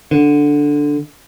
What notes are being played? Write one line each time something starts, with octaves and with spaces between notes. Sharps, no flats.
D3